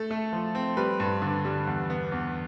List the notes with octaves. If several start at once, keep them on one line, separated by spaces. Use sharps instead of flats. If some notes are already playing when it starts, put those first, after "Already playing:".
Already playing: A3 A4
A3
F3
C4
G3 B4
G2
D3
G3
E2
B3
E2